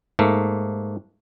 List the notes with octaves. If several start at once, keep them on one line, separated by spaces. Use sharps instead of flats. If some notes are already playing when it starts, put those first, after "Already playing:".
G#2 A3 A#3